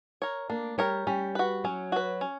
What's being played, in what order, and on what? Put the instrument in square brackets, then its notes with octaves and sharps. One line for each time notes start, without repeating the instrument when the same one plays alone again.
[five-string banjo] A#4 C#5
[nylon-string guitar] A#3 [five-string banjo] D4
[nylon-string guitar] G3 [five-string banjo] A#4 C#5
[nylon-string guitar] G3 [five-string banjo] C#4
[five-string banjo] F#4 B4
[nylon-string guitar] F#3 [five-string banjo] C#4
[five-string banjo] F#4 B4
C#4